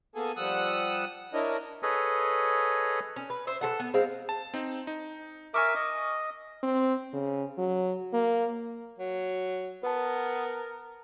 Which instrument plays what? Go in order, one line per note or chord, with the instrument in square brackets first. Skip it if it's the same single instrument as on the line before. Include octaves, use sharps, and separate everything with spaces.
[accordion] A#3 B3 G#4 A4 G#5
F3 G3 F#5 D#6 E6 F#6
D4 E4 A#4 C#5 D#5
[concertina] G#4 A4 B4 C#5 D#5
[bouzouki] C#4
B4
C5 E5
E3 F3 A4 F#5
B3
G#3 C4 F5
[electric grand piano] A5
C4 D#4
D#4
[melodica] A#4 E5 [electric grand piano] G#5 C#6 D6
[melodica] D#5
[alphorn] C4
C#3
F#3
A#3
[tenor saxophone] F#3
[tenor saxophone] B3 [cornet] A#4 [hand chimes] B4 A5